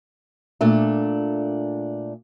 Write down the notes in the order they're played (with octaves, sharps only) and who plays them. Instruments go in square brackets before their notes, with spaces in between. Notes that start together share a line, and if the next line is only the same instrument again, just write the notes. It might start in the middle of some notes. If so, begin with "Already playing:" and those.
[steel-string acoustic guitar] A#2 A3 D4